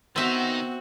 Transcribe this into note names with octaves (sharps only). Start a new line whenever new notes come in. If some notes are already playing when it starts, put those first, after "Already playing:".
D#3 B3 C4 D#4 F#4 E5